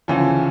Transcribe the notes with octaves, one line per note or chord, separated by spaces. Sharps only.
D2 C#3 E3 F3